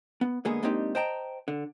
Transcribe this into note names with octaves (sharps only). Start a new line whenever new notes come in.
B3
D3 G#3 A#3 B3 G#4
G#3 A#3 C4 D4 D#4 G4
C5 D#5 G5 A5 A#5
D3